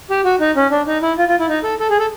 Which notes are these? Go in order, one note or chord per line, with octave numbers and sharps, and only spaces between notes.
G4
F#4
D#4
C#4
D4
D#4
E4
F4
F4
E4
D#4
A4
A4
G#4
A4